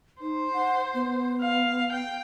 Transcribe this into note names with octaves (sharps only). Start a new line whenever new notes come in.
D#4 C5
F#5
B3
F5
G5